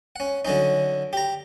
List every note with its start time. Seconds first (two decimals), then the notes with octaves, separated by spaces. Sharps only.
0.16 C#4 F#5
0.45 D3 F#3 C#4 D#4
1.13 G4 A#5